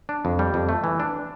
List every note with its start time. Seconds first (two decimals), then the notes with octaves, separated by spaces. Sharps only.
0.09 D4
0.25 F2
0.39 G3
0.54 F2
0.69 A3
0.84 E3
1.00 D4